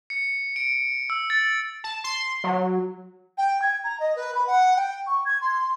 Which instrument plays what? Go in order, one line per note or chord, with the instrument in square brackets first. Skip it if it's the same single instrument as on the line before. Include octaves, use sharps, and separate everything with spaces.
[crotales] C#7
D7
E6
A6
[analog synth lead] A5
C6
F#3
[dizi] G5
G#6
A#5
D#5
B4
B5
F#5
G5
C#6
G#6
C6